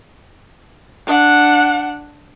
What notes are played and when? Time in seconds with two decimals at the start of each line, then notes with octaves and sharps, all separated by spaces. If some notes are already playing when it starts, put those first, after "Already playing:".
1.06 D4 F#5